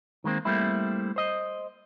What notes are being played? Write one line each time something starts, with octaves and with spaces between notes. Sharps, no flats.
D#3 G#3 A#3 C4
G3 A3 A#3 C4 E4
C5 D#5